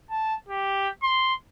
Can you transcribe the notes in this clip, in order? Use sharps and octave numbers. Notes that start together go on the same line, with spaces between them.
A5
G4
C6